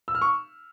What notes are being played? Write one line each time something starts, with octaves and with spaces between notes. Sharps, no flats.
E6
F6
C#6